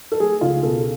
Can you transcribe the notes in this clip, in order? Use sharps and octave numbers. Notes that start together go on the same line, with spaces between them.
A4
A3 G#4
C#2 F4
B2 A4